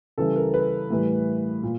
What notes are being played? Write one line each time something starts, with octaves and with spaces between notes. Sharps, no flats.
C#3 E3 G3 A4
A#4
B4
A2 E3 G3
A#2